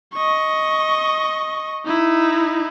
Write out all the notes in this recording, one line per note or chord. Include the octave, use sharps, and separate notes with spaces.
D#5 C#6
D#4 E4